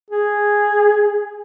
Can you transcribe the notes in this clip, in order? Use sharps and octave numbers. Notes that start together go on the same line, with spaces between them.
G#4